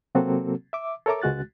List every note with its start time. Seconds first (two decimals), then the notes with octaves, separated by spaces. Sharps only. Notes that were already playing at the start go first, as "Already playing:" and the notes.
0.15 C3 F#3 A#3 C4 F#4 A4
0.73 E5 D6
1.06 A4 A#4 C#5 E5 A#5 D6
1.22 C#2 G#3 F#4 F#6 A6